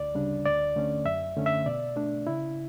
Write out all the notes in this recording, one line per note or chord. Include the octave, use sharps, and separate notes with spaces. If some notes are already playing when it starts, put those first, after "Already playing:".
Already playing: D2 D5
C#3 G3 D4
D2 D5
D3 A3 C#4
F#2 E5
D3 A3 C#4
E5
B2 D5
A3 D4
C#3 E4